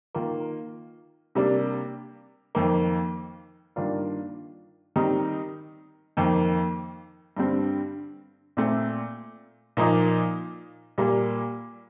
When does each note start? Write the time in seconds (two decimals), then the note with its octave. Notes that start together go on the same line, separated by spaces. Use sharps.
0.15 D#3 A#3 F4
1.35 C3 G3 A#3 D4
2.55 F2 D#3 A#3
3.76 G2 D#3 A#3 D4 F4
4.96 D#3 G3 C4 D#4
6.17 F2 D#3 A#3
7.37 G2 D3 G3 C4
8.57 A#2 A3 C4
9.77 A#2 F3 A#3 D#4
10.98 A#2 G3 A#3